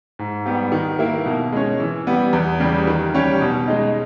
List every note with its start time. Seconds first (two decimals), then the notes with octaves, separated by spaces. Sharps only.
0.19 G#2
0.46 G3 B3 G4
0.72 D#3
0.99 A#3 E4
1.26 B2
1.52 G#3 C#4
1.80 E3
2.07 G3 B3
2.33 E2
2.60 C#3 G3
2.87 D#3
3.14 G3 C#4 G4
3.41 B2
3.68 G#3 D#4